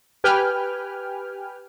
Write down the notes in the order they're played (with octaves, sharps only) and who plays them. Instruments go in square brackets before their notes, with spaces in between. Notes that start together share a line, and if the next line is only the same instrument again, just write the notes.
[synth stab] G4 B4 G5 G#5 F6